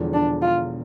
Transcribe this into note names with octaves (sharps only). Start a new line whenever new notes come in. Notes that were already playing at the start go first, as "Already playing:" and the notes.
Already playing: E1 E2 D3 F3
D4
F4